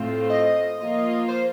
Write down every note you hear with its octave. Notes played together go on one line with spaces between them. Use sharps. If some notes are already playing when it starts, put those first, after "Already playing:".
Already playing: A2 A3 C4 F4
D#5
F3 A#3 F4
C5